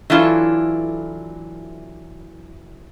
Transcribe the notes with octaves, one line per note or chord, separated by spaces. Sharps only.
E3 F#3 D4 E4 F4 A4